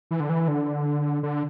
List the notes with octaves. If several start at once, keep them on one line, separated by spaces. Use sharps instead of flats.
E3
D3
E3
D3
D3